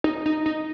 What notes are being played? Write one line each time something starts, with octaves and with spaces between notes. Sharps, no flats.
D#4
D#4
D#4